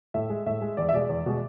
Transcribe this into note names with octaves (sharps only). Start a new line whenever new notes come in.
A2 E5
G#3
A2 E5
G#3
E2 D5
E5
B2 G#3 D5
E2
B2 G#3